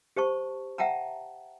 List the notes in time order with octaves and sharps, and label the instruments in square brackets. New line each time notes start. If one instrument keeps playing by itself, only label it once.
[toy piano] G4 C5 A5 C#6
E5 F#5 G5 A5 A#5